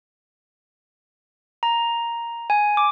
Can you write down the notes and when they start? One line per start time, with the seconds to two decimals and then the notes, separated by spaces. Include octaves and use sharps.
1.63 A#5
2.50 G#5
2.77 D6